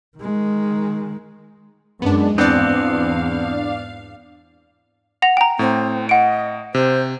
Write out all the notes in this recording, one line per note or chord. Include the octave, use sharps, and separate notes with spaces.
D#3 G#3
F#2 G#3 B3 D4
E2 G#2 B3 C4 D4 D5 F5
F#5 A#6 F7
G5 A#5
A2 C4
D#5 F#5 D7
C3 C5